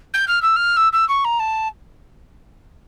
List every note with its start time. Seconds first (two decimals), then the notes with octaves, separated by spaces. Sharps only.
0.13 G6
0.27 F6
0.42 E6
0.56 F6
0.76 E6
0.92 E6
1.08 C#6
1.24 A#5
1.39 A5